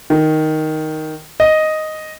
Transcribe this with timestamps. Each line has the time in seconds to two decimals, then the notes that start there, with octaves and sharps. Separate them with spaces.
0.10 D#3
1.40 D#5